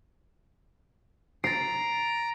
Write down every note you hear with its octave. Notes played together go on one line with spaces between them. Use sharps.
A#5 A6 C7 D7